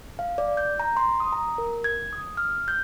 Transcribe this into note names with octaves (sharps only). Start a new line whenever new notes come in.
F5
D5
G6
A#5
C6
D#6
A#5
A#4
G#6
D#6
F6
G6